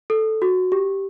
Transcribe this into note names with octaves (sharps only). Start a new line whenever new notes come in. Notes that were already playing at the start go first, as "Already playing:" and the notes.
A4
F#4
G4